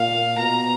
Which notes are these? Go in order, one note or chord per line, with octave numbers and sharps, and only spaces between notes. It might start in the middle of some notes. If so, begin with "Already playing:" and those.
Already playing: A#2 F5
B2 A#5